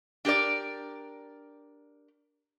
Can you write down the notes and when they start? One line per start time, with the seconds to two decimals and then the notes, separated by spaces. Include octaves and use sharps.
0.25 D4 G4 A#4 D5